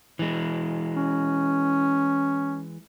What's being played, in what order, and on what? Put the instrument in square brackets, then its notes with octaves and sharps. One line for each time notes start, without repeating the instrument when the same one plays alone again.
[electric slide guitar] E3 G#3
[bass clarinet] C#4